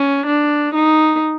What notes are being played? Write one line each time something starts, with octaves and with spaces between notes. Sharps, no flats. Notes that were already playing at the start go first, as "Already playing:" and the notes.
Already playing: C#4
D4
D#4